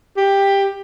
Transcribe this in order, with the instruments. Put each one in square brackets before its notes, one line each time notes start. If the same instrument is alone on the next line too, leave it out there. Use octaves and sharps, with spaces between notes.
[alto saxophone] G4